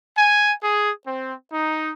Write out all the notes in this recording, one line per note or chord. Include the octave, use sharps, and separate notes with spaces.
G#5
G#4
C4
D#4